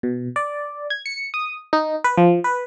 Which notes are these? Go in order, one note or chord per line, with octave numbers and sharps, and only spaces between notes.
B2
D5
G#6
C#7
D#6
D#4
B4
F3
B4